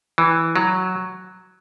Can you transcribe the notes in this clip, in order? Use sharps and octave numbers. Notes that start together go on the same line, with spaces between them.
E3
F#3